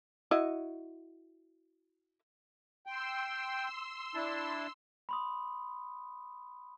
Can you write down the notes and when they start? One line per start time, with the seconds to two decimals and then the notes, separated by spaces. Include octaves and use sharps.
0.31 E4 F#4 D#5
2.86 G5 C6 E6
4.15 D4 E4 A5
5.09 B5 C6 D#6